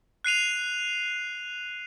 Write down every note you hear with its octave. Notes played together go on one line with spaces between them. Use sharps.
F#6 C7 D#7 F7